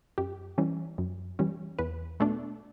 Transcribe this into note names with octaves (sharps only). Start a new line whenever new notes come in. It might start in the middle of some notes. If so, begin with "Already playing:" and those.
F#2 G4
E3 G3 C#4
F#2
E3 G3 C#4
E2 B4
B2 A3 D4